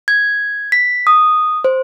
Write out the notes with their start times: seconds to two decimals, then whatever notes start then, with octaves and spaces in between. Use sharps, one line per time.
0.08 G#6
0.72 B6
1.07 D#6
1.65 C5